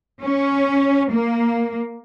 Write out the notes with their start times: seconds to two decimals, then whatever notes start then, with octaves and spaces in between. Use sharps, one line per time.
0.22 C#4
1.11 A#3